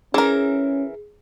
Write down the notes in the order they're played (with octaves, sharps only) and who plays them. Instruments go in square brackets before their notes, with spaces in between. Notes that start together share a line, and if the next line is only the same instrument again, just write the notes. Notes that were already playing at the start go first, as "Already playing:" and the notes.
[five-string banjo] E3 A#4 [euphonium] C#4 [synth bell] G#4